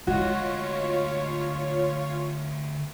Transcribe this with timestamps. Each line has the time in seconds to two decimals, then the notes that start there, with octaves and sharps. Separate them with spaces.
0.07 D2 G#3 F4 F#4 C#5 D#5